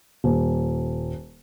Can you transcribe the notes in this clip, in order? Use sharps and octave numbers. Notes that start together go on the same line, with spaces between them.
D#1